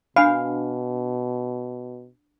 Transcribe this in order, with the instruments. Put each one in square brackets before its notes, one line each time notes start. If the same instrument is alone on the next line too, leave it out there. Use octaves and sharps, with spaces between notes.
[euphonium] B2 [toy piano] D4 G#5 B5 [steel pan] F5